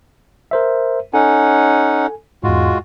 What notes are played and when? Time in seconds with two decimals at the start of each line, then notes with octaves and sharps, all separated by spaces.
0.51 A#4 C5 E5
1.14 C#4 D#4 A4 F#5 G#5
2.44 E2 G#2 G#3 F4 F#4